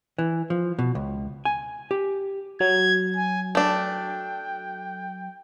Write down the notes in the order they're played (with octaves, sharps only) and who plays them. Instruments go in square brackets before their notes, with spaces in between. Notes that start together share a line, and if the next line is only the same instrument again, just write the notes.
[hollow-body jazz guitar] E3
F3
B2
C#2
G#5
G4
[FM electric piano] F#3 [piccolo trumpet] G#6
[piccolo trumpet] G#5
[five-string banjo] A3 D4 [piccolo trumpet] G5